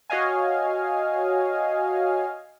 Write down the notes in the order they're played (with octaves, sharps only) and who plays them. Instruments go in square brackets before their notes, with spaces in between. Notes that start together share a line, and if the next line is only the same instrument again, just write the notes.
[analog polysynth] F#4 C#5 D#5 F5 G#5